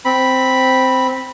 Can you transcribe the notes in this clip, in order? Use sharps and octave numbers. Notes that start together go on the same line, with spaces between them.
C4 B5